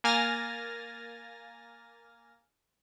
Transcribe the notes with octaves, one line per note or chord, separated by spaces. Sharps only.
A#3 G#5 F6 A6 A#6